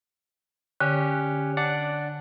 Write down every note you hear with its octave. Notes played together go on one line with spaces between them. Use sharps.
D3 C#4 G4
D4 D5 F#5